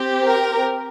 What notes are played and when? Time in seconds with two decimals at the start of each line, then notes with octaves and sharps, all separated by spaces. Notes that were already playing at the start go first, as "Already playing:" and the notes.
Already playing: C4 G4
0.27 A#4